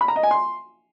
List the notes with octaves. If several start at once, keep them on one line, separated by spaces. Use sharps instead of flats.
B5
A#5
D#5
G#5
C6